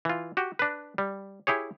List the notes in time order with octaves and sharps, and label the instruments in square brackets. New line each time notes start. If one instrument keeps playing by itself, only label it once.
[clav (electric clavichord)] E3 F4
F#4 G4
D4 B4
G3
E4 G4 G#4 C#5